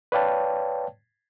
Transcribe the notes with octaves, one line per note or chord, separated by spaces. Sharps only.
B4 C#5 D5 F5 G5 A5